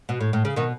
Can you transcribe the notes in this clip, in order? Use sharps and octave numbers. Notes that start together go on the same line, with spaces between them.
B2
A2
A2
C#3
B2 D#3